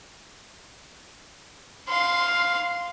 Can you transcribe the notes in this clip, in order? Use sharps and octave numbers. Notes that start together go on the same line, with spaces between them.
F5 C6